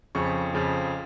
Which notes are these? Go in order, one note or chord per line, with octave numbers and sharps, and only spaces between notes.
F2 C#3 F3 C#6
F2 C#3 F3